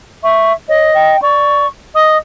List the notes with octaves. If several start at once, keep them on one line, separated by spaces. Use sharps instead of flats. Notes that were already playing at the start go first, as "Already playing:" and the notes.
E5 C#6
C#5 D#5
G5
D5 C#6
D#5 D#6